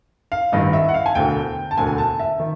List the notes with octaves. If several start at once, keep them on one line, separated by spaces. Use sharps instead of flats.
F5
A1 G2 D#3 D#5
E5
F#5
F5
G#5
E1 D2 D3 G5
A5
E1 D2 D3 G#5
A5
E5
D#3